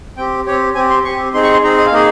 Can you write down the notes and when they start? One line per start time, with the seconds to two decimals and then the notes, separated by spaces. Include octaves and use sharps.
0.17 C4 G4 G5
0.46 C4 G4 C#5
0.75 C4 G4 G#5
0.90 C6
1.05 C4 G4 C#6
1.34 C4 D#4 G#4 C6
1.43 C#6
1.53 C6
1.63 C4 D#4 G#4 A#5
1.77 D#5
1.86 F5
1.92 A#3 D#4 G#4 D#5